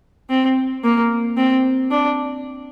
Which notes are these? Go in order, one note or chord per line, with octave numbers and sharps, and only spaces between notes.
C4
A#3
C4
D4